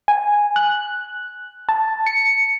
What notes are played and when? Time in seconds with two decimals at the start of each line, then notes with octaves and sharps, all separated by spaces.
0.08 G#5
0.56 F#6
1.69 A5
2.06 C#7